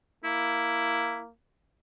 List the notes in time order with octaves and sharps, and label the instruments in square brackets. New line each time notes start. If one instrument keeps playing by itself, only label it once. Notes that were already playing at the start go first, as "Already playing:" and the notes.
[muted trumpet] A#3 [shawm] E4